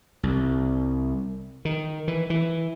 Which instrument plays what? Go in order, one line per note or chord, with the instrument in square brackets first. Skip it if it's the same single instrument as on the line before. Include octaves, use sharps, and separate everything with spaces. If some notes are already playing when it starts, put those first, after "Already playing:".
[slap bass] C2
D#3
E3
E3